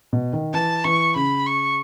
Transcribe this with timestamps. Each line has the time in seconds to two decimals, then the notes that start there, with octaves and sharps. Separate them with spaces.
0.13 B2
0.33 D#3
0.53 E3 A5
0.84 E3 C#6
1.15 C#3 B5
1.46 C#6